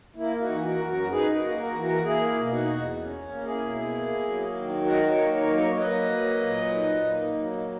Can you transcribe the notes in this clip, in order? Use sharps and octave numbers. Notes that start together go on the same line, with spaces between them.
A#3 E4
D#4 F#4
E3
F#4 A#4
F#2
F#4 A#4
D#4 G#4 B4
F#4 A#4
A#3
F#4 A#4
E3
F#4 A#4
A#3 E4 G#4
B2
D#4 F#4
E2
C#4
A#3
E4 G#4
B2
A#3
F#3
D#3
D#4 F#4 A#4
A#4 C#5
A#3
A#4 C#5
F#3
A#4 C#5
A#3 B4 D#5
F#3
A#2
D#4
A#3
F#3